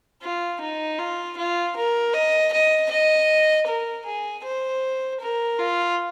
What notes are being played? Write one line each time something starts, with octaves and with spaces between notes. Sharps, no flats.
F4
D#4
F4
F4
A#4
D#5
D#5
D#5
A#4
G#4
C5
A#4
F4